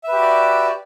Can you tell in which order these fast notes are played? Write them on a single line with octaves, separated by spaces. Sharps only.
E5 B4 G4 F#4 D5